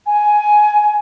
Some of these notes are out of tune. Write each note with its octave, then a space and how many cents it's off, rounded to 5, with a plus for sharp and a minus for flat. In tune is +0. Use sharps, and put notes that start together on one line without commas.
G#5 +15